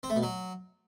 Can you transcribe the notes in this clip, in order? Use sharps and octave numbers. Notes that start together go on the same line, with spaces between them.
C4
A3
B2
F#3